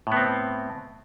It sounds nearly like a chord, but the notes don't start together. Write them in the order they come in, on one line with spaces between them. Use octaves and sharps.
A2 B3 C4